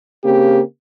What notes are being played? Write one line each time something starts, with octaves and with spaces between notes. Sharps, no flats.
C#3 A#3 C4 G4